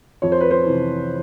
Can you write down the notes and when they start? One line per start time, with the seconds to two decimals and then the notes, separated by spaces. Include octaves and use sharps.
0.22 F2 C#5
0.32 C5
0.41 B4
0.51 C5
0.66 C3 E3